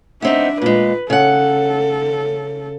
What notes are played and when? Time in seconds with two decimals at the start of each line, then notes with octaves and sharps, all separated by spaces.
0.22 B3 C4 D4 D#4 E5
0.62 A#2 G#3 B4
1.10 C#3 A4 F#5